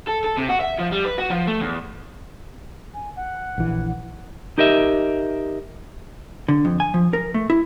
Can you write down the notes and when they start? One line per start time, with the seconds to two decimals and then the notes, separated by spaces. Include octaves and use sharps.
0.07 A4
0.24 A4
0.37 C3
0.49 F#4
0.61 E5
0.79 F3
0.92 G3
1.05 B4
1.18 F#4
1.30 F3
1.47 A3
1.60 E2
2.94 G#5
3.16 F#5
3.58 A#1 E3
4.58 D#4 G4 A#4 D#5 E5
6.48 D3
6.65 F2
6.80 G#5
6.94 F3
7.13 A#4
7.34 A3
7.50 E4